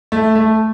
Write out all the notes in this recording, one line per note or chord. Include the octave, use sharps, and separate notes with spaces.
A3
A3